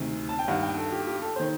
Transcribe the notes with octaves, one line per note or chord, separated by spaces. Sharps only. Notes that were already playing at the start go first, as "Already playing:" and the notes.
Already playing: D2 C3 D#3
A5
G5
G2 D#3 F#5
G5
A4
G4
G4
A4
D#3 C5